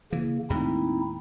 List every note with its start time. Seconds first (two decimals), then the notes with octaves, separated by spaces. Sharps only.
0.12 C#3 E3 A#3
0.50 D#2 A2 G#3 C4 D#4 E4